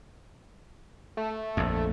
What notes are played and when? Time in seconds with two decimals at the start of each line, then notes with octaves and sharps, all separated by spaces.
1.17 A3
1.57 A#1 F2